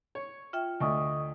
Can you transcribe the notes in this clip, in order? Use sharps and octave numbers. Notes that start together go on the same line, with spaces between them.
C#5
F4 E5 G5
D2 A3 D#5 C#6 D#6